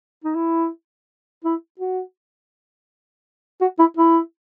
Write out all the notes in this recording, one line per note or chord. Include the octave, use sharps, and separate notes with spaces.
D#4
E4
E4
F#4
F#4
E4
E4